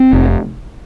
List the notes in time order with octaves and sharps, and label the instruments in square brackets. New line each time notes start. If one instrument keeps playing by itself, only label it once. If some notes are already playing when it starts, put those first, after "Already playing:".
Already playing: [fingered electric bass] C4
F1